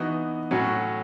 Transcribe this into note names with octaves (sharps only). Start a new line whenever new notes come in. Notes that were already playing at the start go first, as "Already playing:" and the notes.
Already playing: E3 B3 D#4 F#4
A2 F#3 C#4 F#4